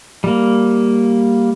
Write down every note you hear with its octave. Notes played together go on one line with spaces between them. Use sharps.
G3 A#3